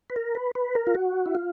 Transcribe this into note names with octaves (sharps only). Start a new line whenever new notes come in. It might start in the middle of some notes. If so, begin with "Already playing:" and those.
B4
A#4
B4
B4
A#4
F4
F#4
E4
F4